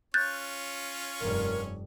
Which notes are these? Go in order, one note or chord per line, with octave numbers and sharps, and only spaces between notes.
C#4 F4 C#5 F#6 G6 A6
F1 G2 A#4